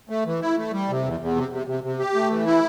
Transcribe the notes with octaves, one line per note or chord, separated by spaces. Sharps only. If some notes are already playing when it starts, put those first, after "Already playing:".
A3
E3
E4
A3
G3
C3
E2
E2
C3
C3
C3
C3
G4
A3
E3
E4